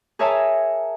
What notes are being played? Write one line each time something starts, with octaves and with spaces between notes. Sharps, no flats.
G#4 A#4 C#5 E5 G#5 A5